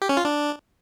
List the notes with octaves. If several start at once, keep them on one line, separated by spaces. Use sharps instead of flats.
G4
C#4
F4
D4